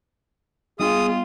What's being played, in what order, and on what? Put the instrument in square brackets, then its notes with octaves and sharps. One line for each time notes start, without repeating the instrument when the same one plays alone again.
[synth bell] G3 B3 [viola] F4 [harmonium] G#4 [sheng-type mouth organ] D#6